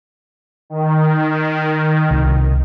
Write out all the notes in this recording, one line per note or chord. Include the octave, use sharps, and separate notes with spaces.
D#3
C2